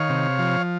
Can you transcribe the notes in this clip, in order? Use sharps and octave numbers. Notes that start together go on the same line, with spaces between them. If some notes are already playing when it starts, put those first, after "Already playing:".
Already playing: D#3 C#5 F5
C3
F3